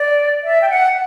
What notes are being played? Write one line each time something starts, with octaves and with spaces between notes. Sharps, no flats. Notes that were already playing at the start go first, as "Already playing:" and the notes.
Already playing: D5
E5
G5
F#5